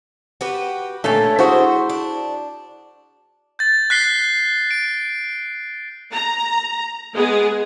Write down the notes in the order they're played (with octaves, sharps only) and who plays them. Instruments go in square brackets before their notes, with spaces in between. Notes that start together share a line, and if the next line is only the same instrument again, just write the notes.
[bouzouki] F#4 G4 B4
[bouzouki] A#2 D3 C#4 [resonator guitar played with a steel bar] A3 A4 C#5
[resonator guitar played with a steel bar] E4 F#4 G#4 [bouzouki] C5
[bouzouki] D4
[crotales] G6 A6
F#6 B6 C7 G7
D7
[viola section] A#5
G#3 B3 G#4